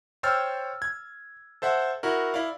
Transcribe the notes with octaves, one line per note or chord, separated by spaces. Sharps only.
C5 C#5 G5 E6 F6 A6
G#6
A4 C5 E5 F#5
E4 F#4 A#4
E4 D5 F5